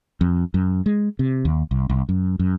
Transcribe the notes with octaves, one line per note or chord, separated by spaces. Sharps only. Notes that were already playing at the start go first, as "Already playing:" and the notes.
F2
F#2
G#3
C3
D#2
C2
C2
F#2
F#2